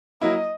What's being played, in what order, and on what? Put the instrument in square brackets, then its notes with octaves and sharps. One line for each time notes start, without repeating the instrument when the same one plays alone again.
[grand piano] F#3 A#3 E4 [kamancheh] D#5